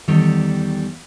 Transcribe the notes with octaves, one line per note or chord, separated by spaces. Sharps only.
E2 D#3 G3 A4 C#5